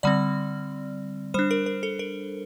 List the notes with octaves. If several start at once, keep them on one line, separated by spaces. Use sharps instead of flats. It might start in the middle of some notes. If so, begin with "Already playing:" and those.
D3 G3 C4 D5
G3 D4 C5
A#4
A#4
A4
A#4